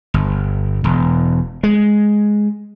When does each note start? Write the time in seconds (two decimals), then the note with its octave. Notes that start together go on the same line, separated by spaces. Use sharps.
0.14 G1
0.84 E1
1.63 G#3